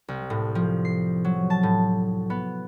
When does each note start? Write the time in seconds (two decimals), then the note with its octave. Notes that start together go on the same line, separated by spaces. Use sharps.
0.08 C2
0.30 A2
0.55 F3
0.85 C7
1.25 F#3
1.50 A5
1.63 A2
2.30 B3